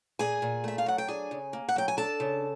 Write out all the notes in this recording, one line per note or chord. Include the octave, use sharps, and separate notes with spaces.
A#2 G#4 G#5
A#2
A3 E5
F5
F#3 F#5
G5
D4 G#4 G#5
C#3
A#3
F#5
F#3 G5
G#5
D4 A4 A5
C#3